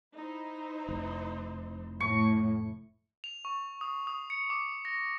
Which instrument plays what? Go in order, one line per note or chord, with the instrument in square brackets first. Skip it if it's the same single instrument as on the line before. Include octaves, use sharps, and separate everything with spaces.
[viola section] D#4 E4 C5
[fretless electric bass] F1
[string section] A2 [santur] C#6
[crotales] F7
C#6
D#6
D#6
C#7
D6
A#6